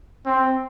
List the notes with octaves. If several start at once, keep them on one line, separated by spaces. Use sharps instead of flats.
C4